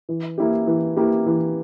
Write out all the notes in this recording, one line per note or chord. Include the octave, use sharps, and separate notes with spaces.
E3
A#3 E4 G4
E3
A#3 E4 G4
E3